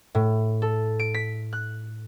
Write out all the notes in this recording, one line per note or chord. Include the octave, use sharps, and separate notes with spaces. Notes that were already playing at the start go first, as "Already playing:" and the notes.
A2
A4
D7
B6
F#6